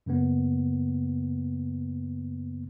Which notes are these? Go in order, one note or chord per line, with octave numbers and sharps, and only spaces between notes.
F#2 C#3 A#3 B3